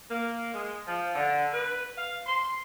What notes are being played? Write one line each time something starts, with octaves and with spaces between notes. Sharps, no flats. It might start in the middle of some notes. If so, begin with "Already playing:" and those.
A#3
G#3
F3
D3
B4
F5
C6